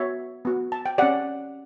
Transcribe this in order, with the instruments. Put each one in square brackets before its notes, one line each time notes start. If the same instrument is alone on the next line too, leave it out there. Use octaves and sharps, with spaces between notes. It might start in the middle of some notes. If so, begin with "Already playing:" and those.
Already playing: [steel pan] B3 F#4 C#5 E5
B3 F#4
A5
G5
C#4 G4 D5 F#5